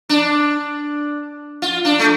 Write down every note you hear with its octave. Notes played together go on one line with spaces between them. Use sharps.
D4
F4
D4
A3